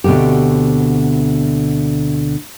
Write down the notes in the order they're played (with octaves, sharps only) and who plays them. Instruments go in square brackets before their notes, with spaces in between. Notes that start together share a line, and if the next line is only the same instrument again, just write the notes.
[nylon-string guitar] D2 B2 D3 C4 G4